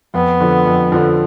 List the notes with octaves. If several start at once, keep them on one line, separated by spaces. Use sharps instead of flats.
F2 B3
D3 F3
F2
D3 F3